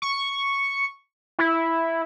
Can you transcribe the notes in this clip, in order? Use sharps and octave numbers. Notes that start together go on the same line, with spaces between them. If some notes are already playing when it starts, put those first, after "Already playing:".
C#6
E4